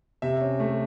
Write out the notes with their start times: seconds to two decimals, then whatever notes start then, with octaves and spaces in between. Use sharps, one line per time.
0.22 C3 E5
0.41 C#4
0.60 A3